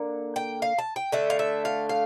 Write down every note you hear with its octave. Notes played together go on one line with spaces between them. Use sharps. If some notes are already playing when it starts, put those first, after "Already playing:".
Already playing: D3 A#3
G5
F5
A5
G5
D3 A3 E5
F5
E5
F5
F5